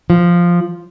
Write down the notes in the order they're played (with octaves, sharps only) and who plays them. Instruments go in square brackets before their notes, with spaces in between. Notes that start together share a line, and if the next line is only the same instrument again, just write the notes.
[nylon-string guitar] F3